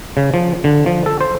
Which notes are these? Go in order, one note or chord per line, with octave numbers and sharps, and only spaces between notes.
C#3
F3
D3
F3
A4
C5